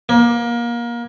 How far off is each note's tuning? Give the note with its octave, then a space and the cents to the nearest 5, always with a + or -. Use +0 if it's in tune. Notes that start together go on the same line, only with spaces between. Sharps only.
A#3 +25